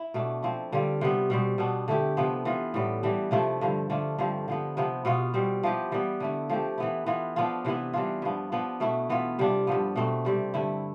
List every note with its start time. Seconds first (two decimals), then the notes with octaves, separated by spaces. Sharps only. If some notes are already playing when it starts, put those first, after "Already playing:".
Already playing: E4
0.14 B2 A3 D4
0.43 F3 C4 E4
0.72 D3 G3 C4 F4
1.01 C3 G3 B3
1.30 B2 G3 C4
1.58 B2 B3 D4
1.88 D3 A3 E4 G4
2.17 C3 F3 B3
2.45 E3 B3 F4
2.74 A2 G3 B3
3.03 E3 G3 D4
3.31 C3 F3 A3 E4
3.61 G2 D3 F3
3.90 D3 A3 D4 F4
4.18 G2 D3 F3 C4
4.48 D3 F3 B3
4.77 C3 F3 B3
5.05 B2 B3 F4
5.34 B2 G3 C4
5.63 F3 B3 E4 G4
5.92 E3 G3 B3
6.20 D3 A3 E4
6.49 F3 A3 C4 G4
6.78 E3 B3 E4
7.06 E3 B3 F4
7.36 F3 B3 D4 F4
7.65 C3 E3 B3 E4
7.93 E3 G3 D4 F4
8.22 G2 F3 B3
8.52 F3 B3 D4
8.80 B2 A3 E4
9.09 E3 B3 F4
9.39 C3 G3 D4 F4
9.67 G2 F3 B3
9.96 B2 A3 C4 E4
10.25 C3 G3 C4
10.54 G2 D3 A3 E4